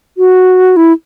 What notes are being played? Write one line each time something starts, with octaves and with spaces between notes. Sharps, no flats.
F#4
E4